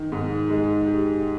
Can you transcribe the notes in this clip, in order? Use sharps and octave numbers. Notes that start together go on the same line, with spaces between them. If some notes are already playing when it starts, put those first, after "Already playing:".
Already playing: D#3
G#2
G#3
G4